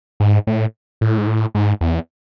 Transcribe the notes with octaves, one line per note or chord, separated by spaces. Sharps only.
G#2
A2
A2
G#2
A2
G#2
E2